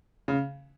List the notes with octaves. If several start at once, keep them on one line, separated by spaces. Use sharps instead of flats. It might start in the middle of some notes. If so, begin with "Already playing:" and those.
C#3